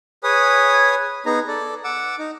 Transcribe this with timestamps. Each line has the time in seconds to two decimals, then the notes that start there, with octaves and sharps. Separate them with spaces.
0.23 G#4 B4 C#5 G#5 D#6
1.26 B3 D#4 G#4 A#5
1.48 A4 D5
1.84 F#5 D6 E6
2.19 D#4